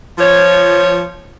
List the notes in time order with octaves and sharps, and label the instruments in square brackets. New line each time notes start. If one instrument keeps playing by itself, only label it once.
[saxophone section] F3 C#5